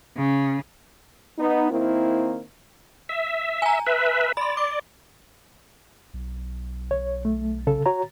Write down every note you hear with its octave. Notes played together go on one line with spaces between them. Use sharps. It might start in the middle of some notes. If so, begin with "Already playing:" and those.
C#3
B3 D#4
D#3 A#3 C4 E4
E5
G#5 A#5
B4 E5
D5 B5 C6
D6
B1
C#5
A3
C2 C#3 A4
F#4 C#5 A#5